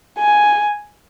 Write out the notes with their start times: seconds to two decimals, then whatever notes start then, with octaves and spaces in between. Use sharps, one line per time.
0.18 G#5